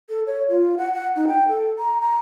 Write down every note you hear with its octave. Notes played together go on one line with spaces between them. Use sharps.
A4
C#5
F4
F#5
F#5
D#4
G5
A4
A#5
A#5